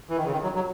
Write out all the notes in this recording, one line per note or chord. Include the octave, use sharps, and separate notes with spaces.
E3
D#3
C#3
D#3
F#3
F#3